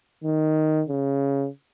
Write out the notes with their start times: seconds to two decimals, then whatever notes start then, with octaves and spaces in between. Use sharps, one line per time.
0.24 D#3
0.89 C#3